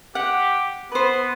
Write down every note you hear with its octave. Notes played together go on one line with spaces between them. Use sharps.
G4 F#5
B3 B4 C5